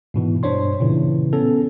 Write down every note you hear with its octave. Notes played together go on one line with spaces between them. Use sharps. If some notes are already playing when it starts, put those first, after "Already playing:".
G#2 B2 E3
G2 D4 C5 C#5 C6
A#2 C#3 E3
B3 C#4 A4